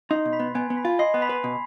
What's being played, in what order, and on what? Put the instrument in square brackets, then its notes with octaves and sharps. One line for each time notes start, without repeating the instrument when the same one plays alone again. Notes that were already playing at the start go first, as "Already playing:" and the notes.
[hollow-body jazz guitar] D#4 [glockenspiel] C6 C7
[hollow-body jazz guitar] B2
[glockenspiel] B5 B6
[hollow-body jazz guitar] B3
[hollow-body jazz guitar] B3 [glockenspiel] G#5 G#6
[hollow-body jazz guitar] B3
[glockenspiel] B5 B6
[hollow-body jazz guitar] F4
[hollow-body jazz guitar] D#5 [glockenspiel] C6 C7
[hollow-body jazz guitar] B3
[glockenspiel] B5 B6
[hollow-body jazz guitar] B4
B2